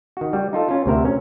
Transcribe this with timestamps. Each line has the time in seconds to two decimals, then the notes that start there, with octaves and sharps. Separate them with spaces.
0.17 D#3 F#4
0.33 G3
0.53 D#4 F4 A4
0.69 C#4 F4
0.86 D2 C3 A#4 E5
1.05 C#4